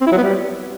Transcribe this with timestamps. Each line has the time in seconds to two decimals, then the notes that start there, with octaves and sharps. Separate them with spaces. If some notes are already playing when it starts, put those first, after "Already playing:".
0.01 C4
0.07 E4
0.12 F#3
0.18 B3
0.23 G3